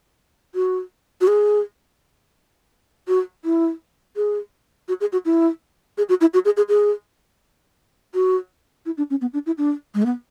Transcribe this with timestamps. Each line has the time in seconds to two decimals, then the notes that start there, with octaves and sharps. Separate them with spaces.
0.55 F#4
1.21 F#4
1.28 G#4
3.08 F#4
3.45 E4
4.16 G#4
4.88 F#4
5.01 G#4
5.12 F#4
5.25 E4
5.98 G#4
6.09 F#4
6.21 E4
6.34 F#4
6.45 G#4
6.57 G#4
6.69 G#4
8.14 F#4
8.86 E4
8.97 D4
9.10 C#4
9.21 B3
9.33 D4
9.46 E4
9.58 D4
9.94 G#3
10.02 A3
10.06 B3